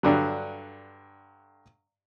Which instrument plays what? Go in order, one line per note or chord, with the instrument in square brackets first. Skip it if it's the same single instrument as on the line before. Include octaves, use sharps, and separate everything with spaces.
[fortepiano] G2 D3 F#3